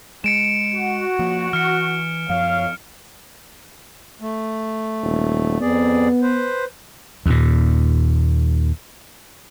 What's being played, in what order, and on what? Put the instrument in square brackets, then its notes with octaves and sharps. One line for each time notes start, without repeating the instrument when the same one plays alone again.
[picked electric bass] G#3 [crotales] C#7 D7 E7
[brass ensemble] F#4
[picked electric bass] F3 A#3
[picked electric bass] E3 [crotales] F6 C#7
[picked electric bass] F#2 F3 [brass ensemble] C#5 F5
[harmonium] A3
[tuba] D#1
[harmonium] F2 G#4 D5 [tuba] B3
[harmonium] B4 C5
[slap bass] D#2 A#2